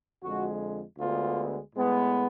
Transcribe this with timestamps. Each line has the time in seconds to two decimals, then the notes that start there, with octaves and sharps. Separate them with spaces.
0.23 F2 D3 G#3 F#4
0.99 D2 D3 G#3 B3 F4
1.75 A2 G#3 B3